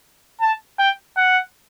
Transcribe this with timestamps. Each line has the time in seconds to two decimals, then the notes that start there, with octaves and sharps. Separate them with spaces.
0.41 A5
0.79 G5
1.17 F#5